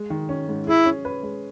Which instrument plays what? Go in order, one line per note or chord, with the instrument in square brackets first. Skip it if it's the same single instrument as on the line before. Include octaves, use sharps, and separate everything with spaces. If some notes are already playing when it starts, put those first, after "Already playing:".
Already playing: [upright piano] G#3
D#3
C#4
G#2
[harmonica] E4 [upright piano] G#4
[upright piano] C#4
B4
G#3